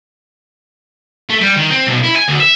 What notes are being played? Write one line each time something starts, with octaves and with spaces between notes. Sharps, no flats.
A3
G3
D#3
C4
B1
E4
G#5
D2
E5